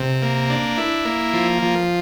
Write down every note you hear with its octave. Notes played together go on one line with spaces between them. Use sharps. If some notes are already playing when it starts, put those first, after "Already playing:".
Already playing: C3
A#3
D4
E4
A#3
F3
F3